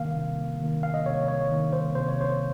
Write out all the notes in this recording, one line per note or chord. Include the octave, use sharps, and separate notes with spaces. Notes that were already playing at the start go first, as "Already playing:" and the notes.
Already playing: C3 D#3 A#3 F5
C3
D#3 A#3
F5
D#5
C3 C#5
C#5
D#3 A#3
C5
C3 C5
C#5
C5